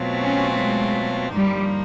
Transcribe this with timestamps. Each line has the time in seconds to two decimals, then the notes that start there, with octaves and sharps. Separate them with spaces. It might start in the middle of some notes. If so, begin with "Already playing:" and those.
Already playing: B2 F#3 A3 C4 F4
0.21 C#4
0.60 G#3
1.35 G2 D3 F3 G3 A#3 D#4